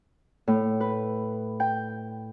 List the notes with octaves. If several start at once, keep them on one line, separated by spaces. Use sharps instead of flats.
A2
B4
G5